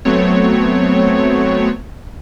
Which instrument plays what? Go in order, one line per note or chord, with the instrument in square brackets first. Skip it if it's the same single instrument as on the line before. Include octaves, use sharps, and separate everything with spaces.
[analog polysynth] F#3 A3 B3 C4 C#5